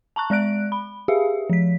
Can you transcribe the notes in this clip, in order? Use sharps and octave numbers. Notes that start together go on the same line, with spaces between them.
A5 A#5 C#6 F#6
G#3 D5 F#6 D7
B5
G4 G#4 E5 F5
F3 B6